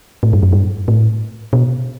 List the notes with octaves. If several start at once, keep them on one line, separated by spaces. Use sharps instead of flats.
A2
G2
F#2
G2
A2
B2